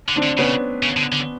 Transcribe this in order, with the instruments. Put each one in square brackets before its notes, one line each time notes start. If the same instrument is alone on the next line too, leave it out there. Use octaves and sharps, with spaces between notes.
[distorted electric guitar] D3
[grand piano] C4 D4
[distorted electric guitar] D3
[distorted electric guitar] C#3 [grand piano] B3 C#4
[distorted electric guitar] C#3
D3
D3